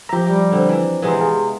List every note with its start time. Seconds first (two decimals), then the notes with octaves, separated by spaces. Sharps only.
0.09 F3 G4 E5 A#5
0.27 G3 G4
0.52 D3 C4
0.69 E3 D4
1.02 C3 E3 G#3 B3
1.21 F4 G#4